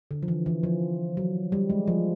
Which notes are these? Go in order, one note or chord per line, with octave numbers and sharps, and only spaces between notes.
D3
F3
E3
E3
F3
F#3
G3
G#3
F3